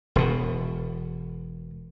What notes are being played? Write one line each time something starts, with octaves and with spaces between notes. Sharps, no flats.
E1 B2